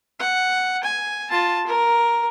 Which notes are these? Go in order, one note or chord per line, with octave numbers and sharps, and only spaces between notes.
F#5
G#5
F4 A5
A#4